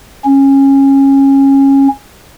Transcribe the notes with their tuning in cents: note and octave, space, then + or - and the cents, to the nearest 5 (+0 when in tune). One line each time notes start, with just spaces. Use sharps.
C#4 -20